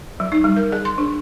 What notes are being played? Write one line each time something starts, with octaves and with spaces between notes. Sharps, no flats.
F#3
D#4
G3
A#4
G#4
C6
D4